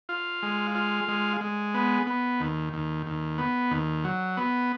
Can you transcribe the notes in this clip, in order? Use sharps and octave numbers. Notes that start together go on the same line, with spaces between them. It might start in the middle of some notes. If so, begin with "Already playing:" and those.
F4
G#3
F4
G#3
G#3
B3
B3
D#2
D#2
D#2
B3
D#2
F#3
B3